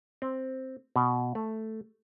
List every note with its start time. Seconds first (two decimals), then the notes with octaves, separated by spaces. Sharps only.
0.22 C4
0.96 B2
1.35 A3